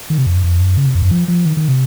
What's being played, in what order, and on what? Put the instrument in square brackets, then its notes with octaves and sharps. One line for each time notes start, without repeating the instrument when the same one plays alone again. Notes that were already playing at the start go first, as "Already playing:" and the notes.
[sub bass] D#3
C3
F2
F#2
F2
F#2
C#3
C3
F2
F#2
F3
F3
D#3
D#3
C3